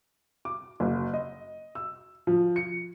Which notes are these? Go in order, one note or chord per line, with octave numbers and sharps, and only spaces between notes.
D6
F#1
D#5
E6
F3
C#7